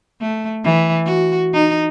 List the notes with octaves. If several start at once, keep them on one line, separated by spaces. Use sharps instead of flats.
A3
E3
F#4
D#4